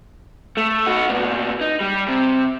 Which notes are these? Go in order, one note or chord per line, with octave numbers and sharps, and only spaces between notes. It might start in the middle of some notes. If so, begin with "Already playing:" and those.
A3
D#4 F#4
A#2 B3
D#4
G3
C3